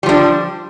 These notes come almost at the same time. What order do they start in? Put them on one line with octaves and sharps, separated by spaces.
G3 F3 D4